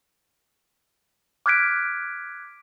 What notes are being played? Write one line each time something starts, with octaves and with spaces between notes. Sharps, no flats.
D6 F6 F#6 G#6 B6 D7